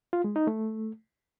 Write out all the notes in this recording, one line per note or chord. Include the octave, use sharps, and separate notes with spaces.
F4
G#3
D#4
A3